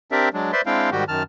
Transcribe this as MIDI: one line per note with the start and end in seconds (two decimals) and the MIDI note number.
0.12 0.29 60
0.12 0.29 62
0.12 0.29 67
0.12 0.29 70
0.12 0.29 74
0.12 0.29 76
0.34 0.52 54
0.34 0.52 56
0.34 0.52 62
0.53 0.61 71
0.53 0.61 72
0.53 0.61 74
0.53 0.61 76
0.53 0.61 84
0.66 0.90 56
0.66 0.90 60
0.66 0.90 62
0.66 0.90 64
0.66 0.90 77
0.66 0.90 79
0.92 1.04 44
0.92 1.04 51
0.92 1.04 55
0.92 1.04 66
0.92 1.04 67
1.08 1.23 42
1.08 1.23 51
1.08 1.23 81
1.08 1.23 89